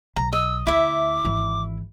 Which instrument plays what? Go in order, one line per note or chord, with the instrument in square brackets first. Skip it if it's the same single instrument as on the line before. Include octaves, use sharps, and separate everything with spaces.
[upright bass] B1 [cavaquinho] A#5
[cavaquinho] D#5 [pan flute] E6
[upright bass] D2 [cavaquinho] E4 E5 [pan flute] D6
[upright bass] G#1 E3